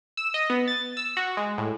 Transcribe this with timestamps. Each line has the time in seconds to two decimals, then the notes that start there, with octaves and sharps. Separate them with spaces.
0.17 E6
0.34 D#5
0.50 B3
0.68 A6
0.97 E6
1.17 F#4
1.37 G#3
1.58 A2